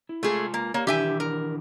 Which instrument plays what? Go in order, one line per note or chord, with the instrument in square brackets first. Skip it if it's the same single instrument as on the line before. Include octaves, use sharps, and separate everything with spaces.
[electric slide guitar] E4
[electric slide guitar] G#3 F4 G#5 [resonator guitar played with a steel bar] A3 G#4
[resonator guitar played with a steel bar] A#3
[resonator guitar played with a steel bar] A#3 [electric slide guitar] G4 C#5
[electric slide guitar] D#3 E3 D4 [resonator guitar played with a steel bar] G4 E5 G#5
[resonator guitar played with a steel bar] A#4